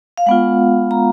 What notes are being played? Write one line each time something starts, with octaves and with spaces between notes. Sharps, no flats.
F5
G#3 B3 F4 F#5
A#5